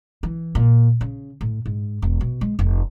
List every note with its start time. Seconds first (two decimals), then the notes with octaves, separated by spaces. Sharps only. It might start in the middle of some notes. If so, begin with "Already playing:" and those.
0.23 E3
0.55 A#2
1.01 C#3
1.41 A2
1.66 G#2
2.02 E1
2.21 B2
2.41 G#3
2.59 F1